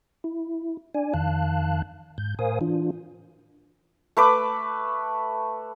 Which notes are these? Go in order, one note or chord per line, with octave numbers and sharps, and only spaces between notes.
E4
D4 D5 G#5
F2 D#3 F5 A5 F#6
G#2 G6
A2 A#4 C5 F5 G#5 D#6
E3 D4 F4
A3 B4 D6